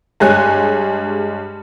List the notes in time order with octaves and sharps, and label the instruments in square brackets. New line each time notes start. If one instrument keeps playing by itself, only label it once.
[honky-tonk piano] G2 G#3 C#5 G#5 F#6